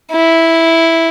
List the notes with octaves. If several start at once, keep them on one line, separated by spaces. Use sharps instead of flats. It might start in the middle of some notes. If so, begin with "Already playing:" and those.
E4